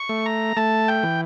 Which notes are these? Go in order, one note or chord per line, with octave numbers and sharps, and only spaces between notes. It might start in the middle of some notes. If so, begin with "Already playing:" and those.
Already playing: C#6
A3
A#5
A3 A5
G5
E3